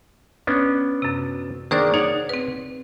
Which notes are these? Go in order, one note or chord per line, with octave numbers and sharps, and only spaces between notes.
B3 C#4 D4
F#2 C3
D#3 A#3 D4 G#4 C5 D5
D#4 C#5 D5 F#5
C4 B4